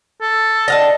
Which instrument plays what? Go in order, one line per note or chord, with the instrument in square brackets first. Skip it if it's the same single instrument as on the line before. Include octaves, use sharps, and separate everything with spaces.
[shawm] A4
[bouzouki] D#5 F5 A5